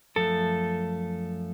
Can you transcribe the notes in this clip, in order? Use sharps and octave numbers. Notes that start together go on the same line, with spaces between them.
F#2 F3 A3 A4